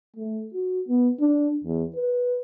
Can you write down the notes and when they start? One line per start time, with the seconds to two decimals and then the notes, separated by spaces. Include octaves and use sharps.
0.16 A3
0.54 F#4
0.88 B3
1.20 D4
1.64 E2
1.96 B4